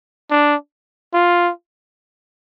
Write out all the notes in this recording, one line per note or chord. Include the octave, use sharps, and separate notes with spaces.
D4
F4